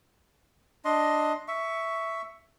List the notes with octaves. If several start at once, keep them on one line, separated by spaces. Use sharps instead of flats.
D4 D#5 C6
E5 C#6